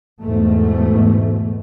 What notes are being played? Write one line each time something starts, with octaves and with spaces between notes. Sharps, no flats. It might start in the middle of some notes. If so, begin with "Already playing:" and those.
E2 G#2 B2 A3